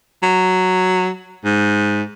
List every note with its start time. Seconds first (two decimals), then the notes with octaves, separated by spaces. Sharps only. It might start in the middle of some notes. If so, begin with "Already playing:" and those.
0.23 F#3
1.45 G#2